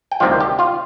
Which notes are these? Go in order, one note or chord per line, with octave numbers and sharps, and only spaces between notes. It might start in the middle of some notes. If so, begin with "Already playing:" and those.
G5
D2 C3 D#3 G3 F4 F5
G4 G5
F4 F5